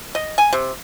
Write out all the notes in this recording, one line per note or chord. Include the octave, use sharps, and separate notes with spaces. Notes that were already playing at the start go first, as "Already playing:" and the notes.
D#5
G#5
C3